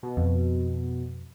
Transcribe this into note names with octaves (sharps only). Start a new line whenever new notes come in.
B2
F2